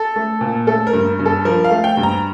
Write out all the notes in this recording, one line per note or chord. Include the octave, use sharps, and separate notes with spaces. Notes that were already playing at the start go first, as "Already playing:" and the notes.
Already playing: A4
A3
A#2
A3 A4
A#4
G2
G2
A4
F3 A#4
F5
A3
G5
G2
A#5